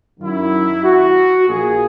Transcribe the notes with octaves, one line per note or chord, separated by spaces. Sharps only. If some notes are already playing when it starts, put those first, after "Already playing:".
F#2 D#3 F#3 E4
F#4
A#1 A#2 A#3 G#4